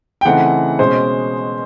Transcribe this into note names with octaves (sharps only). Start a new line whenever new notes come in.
G5
C#3 E3 A3 C4 D#4 F#5
B2 G#3 C#4 C5